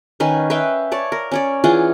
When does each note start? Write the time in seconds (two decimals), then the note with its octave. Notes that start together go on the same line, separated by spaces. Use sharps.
0.20 D#3 C#4 B4 G#5
0.50 B4 E5 F5 G5
0.92 C#5 D5 A5
1.12 A#4
1.31 C#4 C#5 D5
1.64 E3 F4 G#4 F#5